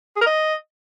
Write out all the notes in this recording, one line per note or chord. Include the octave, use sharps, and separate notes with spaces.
G#4
A#4
D#5